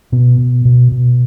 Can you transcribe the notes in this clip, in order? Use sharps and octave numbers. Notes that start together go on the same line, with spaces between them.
B2 B3
B2
B2
B2